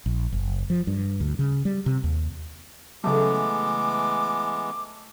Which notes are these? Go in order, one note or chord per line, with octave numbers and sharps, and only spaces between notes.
A#1
F#1
F3
G2
D2
C#3
G3
C3
D#2
C#3 E3 F#3 G#3 A3 B3 D6